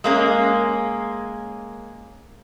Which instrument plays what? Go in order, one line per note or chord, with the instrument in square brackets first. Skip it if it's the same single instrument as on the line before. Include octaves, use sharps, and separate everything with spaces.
[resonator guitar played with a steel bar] G#3 A#3 C#4